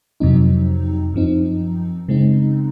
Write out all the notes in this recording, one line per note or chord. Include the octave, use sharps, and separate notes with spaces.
F2 C3 F#3 C4 D#4
F#2 F3 C4 D#4
C#3 G#3 C4 D#4